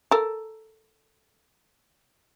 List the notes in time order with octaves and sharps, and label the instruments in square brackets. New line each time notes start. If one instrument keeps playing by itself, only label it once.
[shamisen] A4 A#4